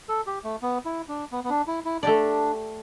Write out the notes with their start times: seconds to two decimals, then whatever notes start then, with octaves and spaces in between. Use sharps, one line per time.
0.09 A4
0.27 G4
0.44 A3
0.62 B3
0.85 E4
1.09 D4
1.32 B3
1.44 B3
1.50 D4
1.67 E4
1.85 E4
2.03 A3 D4 G4 D5